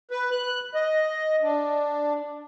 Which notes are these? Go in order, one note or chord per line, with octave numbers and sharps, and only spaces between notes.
B4
F#6
D#5
D4